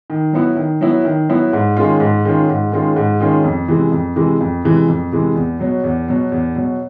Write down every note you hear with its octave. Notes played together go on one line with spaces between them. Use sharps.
D#3
F#3 B3 E4
D#3
F#3 B3 E4
D#3
F#3 B3 E4
G#2
D#3 G#3 C#4 F4
G#2
D#3 G#3 C#4 F4
G#2
D#3 G#3 C#4 F4
G#2
D#3 G#3 C#4 F4
F2
C3 E3 G#3
F2
C3 E3 G#3
F2
C3 E3 G#3
F2
C3 E3 G#3
E2
B2 F#3
E2
B2 F#3
E2
B2 F#3